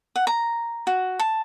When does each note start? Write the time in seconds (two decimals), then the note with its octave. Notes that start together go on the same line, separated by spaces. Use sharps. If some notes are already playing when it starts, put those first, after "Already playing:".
0.16 F#5
0.27 A#5
0.87 F#4
1.19 A5